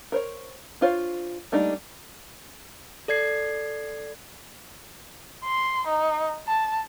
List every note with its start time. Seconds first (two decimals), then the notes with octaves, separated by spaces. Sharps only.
0.12 A#4 C5 C#5
0.81 D4 F4 C5 C#5
1.52 G3 A3 A#3 D4 D#4
3.08 A4 D5 G#6 C7
5.44 C6
5.87 D#4
6.47 A5